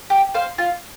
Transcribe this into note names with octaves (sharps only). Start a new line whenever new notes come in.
G4
C5 F5
F4